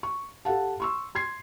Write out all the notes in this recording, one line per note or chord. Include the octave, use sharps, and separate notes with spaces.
C#6
G4 A4 F5 F#5 A5
C6 C#6 E6
C6 G#6 C7